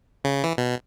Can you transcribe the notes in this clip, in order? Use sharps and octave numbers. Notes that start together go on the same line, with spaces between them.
C#3
E3
B2